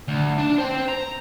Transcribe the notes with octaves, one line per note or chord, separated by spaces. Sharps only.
D2
D4 A5
C5 G5
A#5